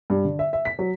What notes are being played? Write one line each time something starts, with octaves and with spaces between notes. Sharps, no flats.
G2
D3
E5
E5
B6
F#3